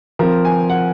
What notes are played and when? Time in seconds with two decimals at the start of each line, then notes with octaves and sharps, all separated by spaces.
0.19 F3 C4 A#4
0.45 G#5
0.70 F#5